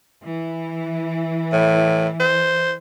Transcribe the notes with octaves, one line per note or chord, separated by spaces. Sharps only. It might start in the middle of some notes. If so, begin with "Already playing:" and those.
E3
A2
C5